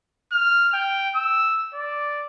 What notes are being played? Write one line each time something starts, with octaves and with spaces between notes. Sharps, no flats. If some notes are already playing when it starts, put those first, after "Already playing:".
F6
G5
E6
D5